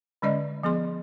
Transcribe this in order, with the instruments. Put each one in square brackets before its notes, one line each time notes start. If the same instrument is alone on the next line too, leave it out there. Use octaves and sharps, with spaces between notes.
[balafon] D3 G#3 C#4 D5 D#5
F3 B3 G#4 C6